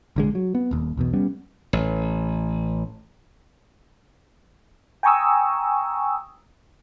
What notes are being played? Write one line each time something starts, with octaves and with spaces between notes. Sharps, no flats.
A#1 D3 G#3
F#3
B3
D#1 D#2
B1 E2 B2
G3 B3 C#4
A1
G5 G#5 A#5 C#6 D#6 E6